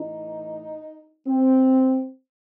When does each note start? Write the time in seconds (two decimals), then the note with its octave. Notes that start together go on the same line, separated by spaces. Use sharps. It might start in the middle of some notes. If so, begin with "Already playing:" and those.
Already playing: A2 E3 D#4
1.28 C4